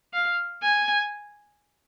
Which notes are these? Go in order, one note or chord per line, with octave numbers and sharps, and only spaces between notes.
F5
G#5